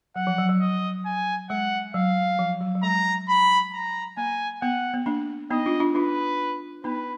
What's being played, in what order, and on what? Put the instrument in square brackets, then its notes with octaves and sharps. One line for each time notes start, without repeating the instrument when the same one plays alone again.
[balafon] F#3 [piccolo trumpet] F#5
[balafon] F3
F#3
F#3
[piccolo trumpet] D#5
G#5
[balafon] G#3 [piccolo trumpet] F#5
[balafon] F#3 [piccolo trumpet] F5
[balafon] F3
F#3
F#3
[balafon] G#3 [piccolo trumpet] A#5
[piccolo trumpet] B5
A#5
[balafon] A#3 [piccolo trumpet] G#5
[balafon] B3 [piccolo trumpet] F#5
[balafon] B3
A#3 D4
[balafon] B3 D#4 [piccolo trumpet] D#5
[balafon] D4 F4
D4 F4
[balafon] D4 F4 [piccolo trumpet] B4
[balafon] B3 D#4 [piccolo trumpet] B4